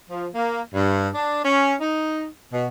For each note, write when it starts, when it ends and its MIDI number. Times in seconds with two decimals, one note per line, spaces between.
0.09 0.26 53
0.34 0.61 58
0.72 1.07 43
1.14 1.41 62
1.43 1.74 61
1.80 2.26 63
2.52 2.66 47